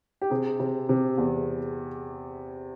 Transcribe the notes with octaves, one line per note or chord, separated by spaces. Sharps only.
G4
C3 G#4
C3
C3
E2